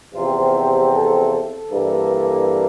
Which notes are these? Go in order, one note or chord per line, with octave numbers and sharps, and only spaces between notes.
E2 C3 F3 C4 F4
G4
A4
A4
G2 E3 A#3